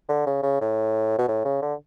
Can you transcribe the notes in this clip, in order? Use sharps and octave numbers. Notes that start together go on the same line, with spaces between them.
D3
C#3
C#3
A2
B2
A2
C#3
D3